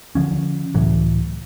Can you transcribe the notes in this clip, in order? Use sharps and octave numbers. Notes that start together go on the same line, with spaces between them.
D3 E3 F3 C#4
C#2 A2 E3 F#3